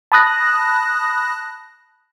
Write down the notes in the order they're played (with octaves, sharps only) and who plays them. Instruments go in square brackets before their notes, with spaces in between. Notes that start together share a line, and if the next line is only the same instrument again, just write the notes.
[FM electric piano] A5 B5 D#6 F#6 A#6